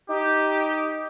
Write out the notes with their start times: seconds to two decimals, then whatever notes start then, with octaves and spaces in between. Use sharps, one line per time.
0.09 D#4 G4